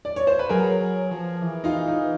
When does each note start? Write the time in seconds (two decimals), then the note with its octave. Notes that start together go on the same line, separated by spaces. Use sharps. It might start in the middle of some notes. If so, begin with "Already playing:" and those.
0.05 D5
0.16 C#5
0.27 C5
0.39 B4
0.49 F#3 G#4 A#4
0.80 F#3
1.11 F3
1.42 E3
1.64 D#4 F4
1.88 D#4